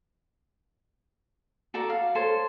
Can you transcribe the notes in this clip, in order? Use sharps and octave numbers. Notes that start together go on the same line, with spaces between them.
F#4 A4 D5 A#5
F5
A4 C5 C#5